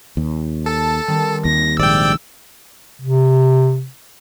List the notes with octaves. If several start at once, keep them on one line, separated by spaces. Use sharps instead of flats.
D#2
A4 A5
D#3 G3 C4
D#2 A#6
A#1 G#2 C3 D5 G5 E6
C3